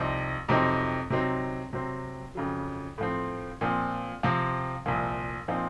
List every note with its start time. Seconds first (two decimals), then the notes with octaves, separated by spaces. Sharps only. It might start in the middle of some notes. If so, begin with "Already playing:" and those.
Already playing: C2 C3 F3 C4 D#4
0.49 F2 C3 F#3 C4 D#4
1.10 C3 F#3 C4 D#4
1.73 C3 F#3 C4
2.35 F2 C#3 F#3
2.98 A2 F3 C4
3.61 A#2 F3 C4
4.23 C3 F3 C4
4.86 C2 A#2 F3
5.48 A#2 F3 C4 D#4